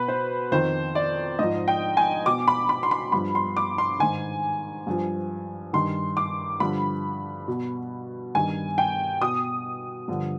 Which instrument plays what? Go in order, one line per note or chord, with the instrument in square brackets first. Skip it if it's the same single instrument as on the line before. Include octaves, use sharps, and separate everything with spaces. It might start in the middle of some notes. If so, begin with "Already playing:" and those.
Already playing: [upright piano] B2 B4
C5
F2 D#3 C5
D5
G#2 F3 D#5
G5
G#5
B2 D6
B5
B5
C6
B5
G2 F3 B5
C6
D6
C6
G#2 D#3 G#5
G2 F3
G2 D#3 C6
D6
G2 D3 F3 B5
B2
G2 D#3 G#5
G5
B2 D#6
G2 D3 F3